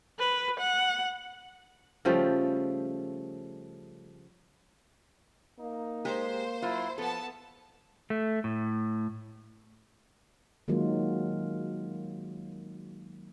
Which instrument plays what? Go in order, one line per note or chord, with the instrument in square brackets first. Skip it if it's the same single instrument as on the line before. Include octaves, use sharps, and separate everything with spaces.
[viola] B4
F#5
[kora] C#3 F3 G3 A3
[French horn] A#3 [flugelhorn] D#4
[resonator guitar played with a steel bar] G#3 G4 A#4 [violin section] C5
[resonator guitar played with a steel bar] F#3 F4 [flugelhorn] E4
[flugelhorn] F3 [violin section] B3 A5 [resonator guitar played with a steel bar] A4
[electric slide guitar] A3
A2
[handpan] D#3 F#3 G#3 A#3 F4